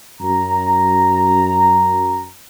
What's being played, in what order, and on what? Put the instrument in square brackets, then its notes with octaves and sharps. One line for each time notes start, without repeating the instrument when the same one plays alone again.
[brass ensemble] F#2 A#5